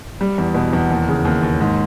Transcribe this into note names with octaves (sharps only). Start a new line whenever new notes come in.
G3
E2
B2
E2
D#2
C#3
D#2
D#2
G#2